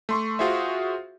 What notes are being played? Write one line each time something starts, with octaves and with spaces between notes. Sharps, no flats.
A3 C6 C#6
F4 F#4 G#4 C5 E5